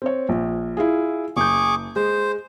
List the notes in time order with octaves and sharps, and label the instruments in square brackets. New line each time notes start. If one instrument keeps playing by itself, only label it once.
[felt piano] C4 C#5
A#1
E4 F4 G#4
[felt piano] F#1 G6 [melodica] G#4 C#6 D6
[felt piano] G#3 [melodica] C5